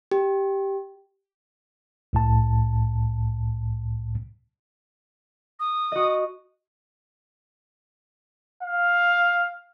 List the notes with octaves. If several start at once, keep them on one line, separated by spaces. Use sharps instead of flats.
G4
C2 A2 A5
D#6
F#4 D#5
F5